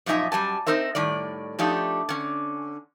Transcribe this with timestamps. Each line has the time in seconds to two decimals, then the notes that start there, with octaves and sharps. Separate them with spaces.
0.06 F#2 A#2 F3 D#4 E5 G#5
0.32 F#2 G3 G#5 A5
0.67 C4 D#4 A#4 C5 E5
0.95 A2 D#3 G3 D5
1.59 F3 A3 D4 D#4 G4
2.09 D3 C#4